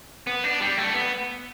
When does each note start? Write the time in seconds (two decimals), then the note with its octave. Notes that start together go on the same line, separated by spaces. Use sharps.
0.27 B3
0.44 D4
0.61 G3
0.78 A3
0.94 B3